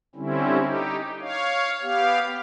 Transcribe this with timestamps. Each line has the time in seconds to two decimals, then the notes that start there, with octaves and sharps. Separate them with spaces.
0.15 D3 G3 C4 C#4 E4
0.60 D#4 G4
1.20 C#5 F5
1.82 B3 G4 F5